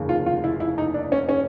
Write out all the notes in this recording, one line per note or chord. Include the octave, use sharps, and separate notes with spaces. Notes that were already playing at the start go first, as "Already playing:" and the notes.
Already playing: F1 D#2 C#3
F4
F4
E4
E4
D#4
D4
C#4
C#4